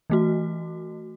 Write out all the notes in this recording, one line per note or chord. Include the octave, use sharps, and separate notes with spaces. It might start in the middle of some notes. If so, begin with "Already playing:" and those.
E3 A3 F#4